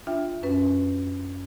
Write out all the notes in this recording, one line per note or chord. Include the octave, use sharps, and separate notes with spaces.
D4 F4 E5 G5
F#2 C#4 B4